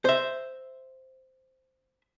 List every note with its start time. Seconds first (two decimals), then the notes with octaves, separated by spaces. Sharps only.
0.05 C5 E5